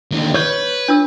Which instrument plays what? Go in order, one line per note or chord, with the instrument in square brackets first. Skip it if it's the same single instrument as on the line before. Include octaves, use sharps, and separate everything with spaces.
[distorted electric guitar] D#2 D3
[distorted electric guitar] B4 [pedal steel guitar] C#5 G6
[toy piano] D4 F4 E6